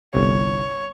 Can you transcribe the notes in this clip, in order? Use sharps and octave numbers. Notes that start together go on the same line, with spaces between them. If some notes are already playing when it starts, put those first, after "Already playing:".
G1 C2 C#5